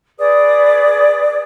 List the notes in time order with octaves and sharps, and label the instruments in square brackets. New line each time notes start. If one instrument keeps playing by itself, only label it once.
[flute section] G#4 B4 D5 D#6